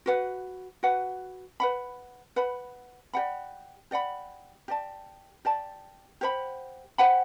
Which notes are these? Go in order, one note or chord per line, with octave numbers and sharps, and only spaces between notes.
F#4 B4 F#5
F#4 B4 F#5
B4 F#5 B5
B4 F#5 B5
G4 D5 F#5 B5
G4 D5 F#5 B5
G4 D5 A5
G4 D5 A5
G4 C5 F#5 B5
G4 C5 F#5 B5